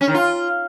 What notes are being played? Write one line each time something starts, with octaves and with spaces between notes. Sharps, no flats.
C#4
D#3
F4